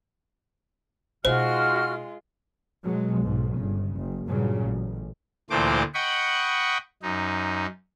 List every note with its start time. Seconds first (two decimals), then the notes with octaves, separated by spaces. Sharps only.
1.25 B2 G#3 D#4 F4 F#4 C5 F6
2.83 B2 F#3 G#3
3.21 B1 G#2
3.55 G1 C#3
3.96 F#1
4.27 G2 A#2 C#3 F#3
4.66 A1
5.50 D2 A#2 E3 A3 C5 D6
5.94 D#5 F#5 G5 B5 C#6
7.02 F#2 D#4